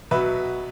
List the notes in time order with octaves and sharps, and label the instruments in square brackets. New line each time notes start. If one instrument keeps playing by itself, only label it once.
[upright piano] B2 F#3 B4 E5